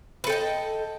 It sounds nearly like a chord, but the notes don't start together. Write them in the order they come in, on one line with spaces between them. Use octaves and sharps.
B4 A4 G5 D#5